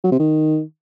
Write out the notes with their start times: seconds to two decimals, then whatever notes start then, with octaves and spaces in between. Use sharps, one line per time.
0.04 F#3
0.12 C3
0.20 D#3